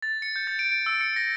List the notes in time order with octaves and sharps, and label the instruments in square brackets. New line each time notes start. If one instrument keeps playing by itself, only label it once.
[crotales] A6
C#7
G6
A6
D7
D7
E6
C#7
A#6